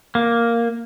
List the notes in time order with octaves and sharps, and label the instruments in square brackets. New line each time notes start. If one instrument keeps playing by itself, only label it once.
[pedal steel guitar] A#3